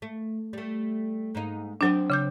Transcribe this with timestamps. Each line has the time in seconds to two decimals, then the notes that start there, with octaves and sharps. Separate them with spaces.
0.02 A3
0.53 G3 A3
1.35 G#2 A#3 D#4
1.81 F#3 C4 D4 A4 D#5
2.10 C#3 D6 G6